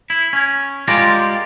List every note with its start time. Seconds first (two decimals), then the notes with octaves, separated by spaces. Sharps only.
0.10 E4
0.33 C#4
0.88 G#3 F4 G4 A#4 D5